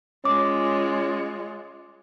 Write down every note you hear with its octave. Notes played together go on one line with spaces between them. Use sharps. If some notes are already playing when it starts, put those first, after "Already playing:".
G#3 C#4 F4 D6